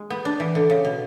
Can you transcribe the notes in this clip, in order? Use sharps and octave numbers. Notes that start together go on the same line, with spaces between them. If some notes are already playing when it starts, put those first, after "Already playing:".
Already playing: G#3
B3
D4
E3
D3
C#3
B2